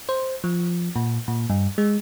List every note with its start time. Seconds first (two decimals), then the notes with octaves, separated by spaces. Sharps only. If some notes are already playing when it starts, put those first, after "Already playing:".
0.09 C5
0.44 F3
0.96 A#2
1.28 A#2
1.50 G2
1.78 G#3